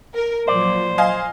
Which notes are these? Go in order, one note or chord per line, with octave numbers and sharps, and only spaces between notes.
A#4
A#2 F3 F#3 C5 D5
D#5 F5 G#5